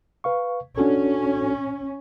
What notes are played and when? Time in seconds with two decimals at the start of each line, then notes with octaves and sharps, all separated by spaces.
0.24 B4 F5 C#6
0.77 C#4 D4 F#4 A4